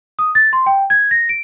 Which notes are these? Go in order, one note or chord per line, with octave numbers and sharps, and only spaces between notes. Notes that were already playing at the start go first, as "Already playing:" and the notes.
D#6
A6
C6
G5
G#6
A#6
D7